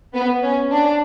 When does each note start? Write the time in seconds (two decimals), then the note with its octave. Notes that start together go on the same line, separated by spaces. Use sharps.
0.14 B3
0.43 C#4
0.71 D4